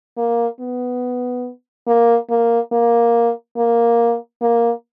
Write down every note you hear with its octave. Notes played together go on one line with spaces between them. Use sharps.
A#3
B3
A#3
A#3
A#3
A#3
A#3